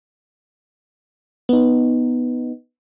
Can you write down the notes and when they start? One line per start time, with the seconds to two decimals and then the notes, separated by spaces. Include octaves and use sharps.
1.49 B3 D#4